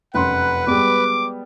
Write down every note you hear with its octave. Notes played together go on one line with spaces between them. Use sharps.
F1 F#2 B4 F#5 C6
G3 G#3 B3 D6